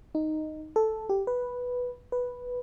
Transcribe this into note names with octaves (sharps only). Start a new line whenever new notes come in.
D#4
A4
G4
B4
B4